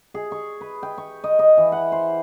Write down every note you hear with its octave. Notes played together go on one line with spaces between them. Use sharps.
G#4
C#6
B4
G5
C#6
D#5
D#5
E3
F#5
C5